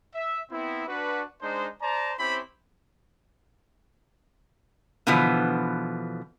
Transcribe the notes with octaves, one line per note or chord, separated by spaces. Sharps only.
E5
B3 C4 E4
D4 F#4 B4
G#3 D4 D#4 C5
C5 D5 A5 A#5
C4 C#4 E4 G4 C5 B5
B2 D3 E3 F3 B3